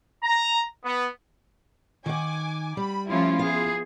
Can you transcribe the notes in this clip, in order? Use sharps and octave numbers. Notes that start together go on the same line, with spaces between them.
A#5
B3
D#3 F#5 G#5 D6
G3 B5
F3 A3 C#4 E4 F4
B3 G#4 F5